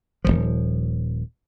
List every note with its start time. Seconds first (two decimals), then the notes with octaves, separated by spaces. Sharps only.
0.24 D#1 B1 F3